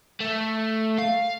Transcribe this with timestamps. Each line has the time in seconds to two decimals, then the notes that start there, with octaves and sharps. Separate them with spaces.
0.21 A3
0.98 F5